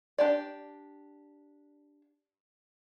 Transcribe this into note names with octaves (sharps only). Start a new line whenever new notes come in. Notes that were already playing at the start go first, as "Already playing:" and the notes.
D4 G4 D5